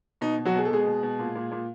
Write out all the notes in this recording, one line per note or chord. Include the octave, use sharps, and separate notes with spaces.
B2 D#4
B2
F#3 F#4
B2 G#4
A4
B2 G#3 G#4
B2
B2
A#2
A#2
A#2